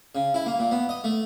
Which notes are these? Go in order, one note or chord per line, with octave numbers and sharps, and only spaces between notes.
C#3
E4
A#3
A#2
B3
D#5
A3